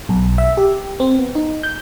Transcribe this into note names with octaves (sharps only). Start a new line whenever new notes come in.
B1
E5
G4
C4
B3
D#4
G6